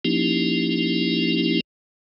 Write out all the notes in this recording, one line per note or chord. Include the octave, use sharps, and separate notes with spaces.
F3 A#3 C#4 D#4 E4 G4